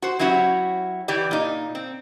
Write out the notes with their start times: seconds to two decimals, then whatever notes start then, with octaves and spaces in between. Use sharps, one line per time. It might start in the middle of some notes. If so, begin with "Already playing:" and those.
0.02 F#4 C5
0.19 F#3 C#4 E4 F#4 G4
1.08 E3 G4 D5
1.31 A#2 D#4
1.75 C4